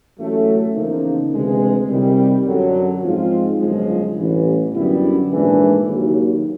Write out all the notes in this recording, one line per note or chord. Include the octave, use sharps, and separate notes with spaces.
A1 A2 F#3 A3 C#4
E2 C#3 F3 A#3 D#4
D2 C3 E3 G#3
C2 C3 D#3 G3
F#2 D3 F#3
G#2 F3 G#3 C4 F4
G1 F#2 C#3 F3 G#3
A1 G2 E3
F#2 D3 G3 B3 E4
A#1 G#2 E3 A3 D4
D#2 C#3 F#3